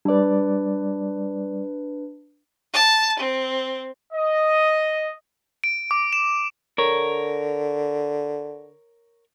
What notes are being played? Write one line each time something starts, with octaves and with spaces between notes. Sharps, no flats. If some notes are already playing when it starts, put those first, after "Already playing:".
G3 D4 B4 D5
A5
C4
D#5
D7
D6
E7
D3 A#4 C#5